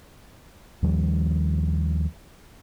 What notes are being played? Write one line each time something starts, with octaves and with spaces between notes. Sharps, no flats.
D#2 D#3 F3 G3